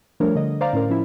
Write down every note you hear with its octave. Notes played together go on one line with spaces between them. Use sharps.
F3 G3 A3 D4 A#4 C#5
D3 D#5
C5 D5 F5 A#5
A2 C#4 A#4
F3 C#4 E4